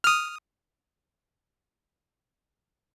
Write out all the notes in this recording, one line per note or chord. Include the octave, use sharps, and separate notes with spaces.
D#6 F6